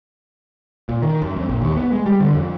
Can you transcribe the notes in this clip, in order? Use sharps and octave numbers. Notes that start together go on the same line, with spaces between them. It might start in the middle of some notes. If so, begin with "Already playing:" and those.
A#2
D#3
F#2
F2
A#1
D#2
B3
G#3
G3
D3
F2